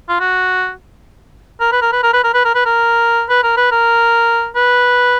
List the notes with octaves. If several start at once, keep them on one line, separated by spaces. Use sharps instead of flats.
F4
F#4
A#4
B4
A#4
B4
A#4
B4
A#4
B4
A#4
B4
A#4
B4
A#4
B4
A#4
B4